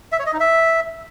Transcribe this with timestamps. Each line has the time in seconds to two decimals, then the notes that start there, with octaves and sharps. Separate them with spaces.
0.12 E5
0.19 C#5
0.26 D#5
0.33 D#4
0.40 E5